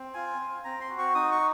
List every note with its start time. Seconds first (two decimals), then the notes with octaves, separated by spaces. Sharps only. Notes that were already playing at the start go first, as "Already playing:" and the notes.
Already playing: C4
0.14 F4 G#5
0.39 C4
0.64 C4 A#5
0.81 C6
0.89 F#4
0.98 C#6
1.15 D#4 D#6
1.32 C#6